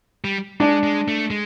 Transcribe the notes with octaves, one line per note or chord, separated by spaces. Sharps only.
G3
G#3 D4
G#3
A3
G#3